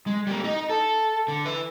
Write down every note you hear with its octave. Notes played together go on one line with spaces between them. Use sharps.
G#3
G3 A#3
D#4 D#5
A4
D3
B4 E5